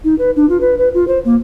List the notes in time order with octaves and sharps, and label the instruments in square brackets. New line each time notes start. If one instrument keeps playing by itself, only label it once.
[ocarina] D#4
B4
D4
F4
B4
B4
F4
C5
A#3